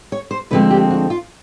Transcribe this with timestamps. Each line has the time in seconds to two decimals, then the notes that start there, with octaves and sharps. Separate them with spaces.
0.12 C#5
0.31 C5
0.51 D2 D3 F3 G#3 C4 B4
0.71 G4
0.90 F#4
1.10 F4